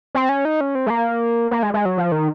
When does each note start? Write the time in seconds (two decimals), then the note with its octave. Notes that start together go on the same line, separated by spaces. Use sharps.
0.15 C4
0.29 C#4
0.45 D#4
0.61 C#4
0.75 C4
0.87 G#3
0.90 A#3
1.51 A#3
1.63 G#3
1.74 G#3
1.85 F#3
1.97 F3
2.12 D#3